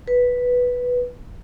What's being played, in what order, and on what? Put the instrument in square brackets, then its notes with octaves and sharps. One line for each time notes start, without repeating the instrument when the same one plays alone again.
[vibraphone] B4